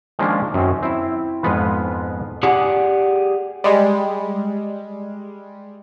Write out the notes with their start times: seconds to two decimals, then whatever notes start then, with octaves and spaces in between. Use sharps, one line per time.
0.19 D#3 F3 G#3 A#3 C#4 D4
0.54 F#2 D#3 C4 C#4
0.83 C4 E4
1.43 F2 G#2 G#3 B3 F4 B4
2.43 G4 G#4 D5 F#5 G#5
3.64 G3 G#3